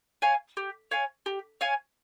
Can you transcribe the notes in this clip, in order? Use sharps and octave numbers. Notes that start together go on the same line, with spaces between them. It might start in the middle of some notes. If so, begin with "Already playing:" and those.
C#5 F5 G#5
G4
C#5 F5 G#5
G4
C#5 F5 G#5